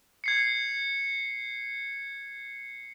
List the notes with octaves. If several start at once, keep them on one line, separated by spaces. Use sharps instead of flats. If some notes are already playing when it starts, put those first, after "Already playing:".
G#6 C7 C#7